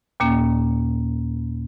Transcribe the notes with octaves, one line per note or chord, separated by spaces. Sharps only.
D#2 A#2 A#3 C#4